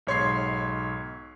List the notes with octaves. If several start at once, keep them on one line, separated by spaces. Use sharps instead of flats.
B1 G#2 C#5 C6 G#6 C7